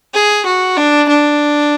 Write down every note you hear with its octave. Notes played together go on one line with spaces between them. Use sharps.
G#4
F#4
D4
D4